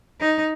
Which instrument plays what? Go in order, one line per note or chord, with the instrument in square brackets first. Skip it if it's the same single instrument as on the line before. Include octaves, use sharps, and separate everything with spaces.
[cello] D#4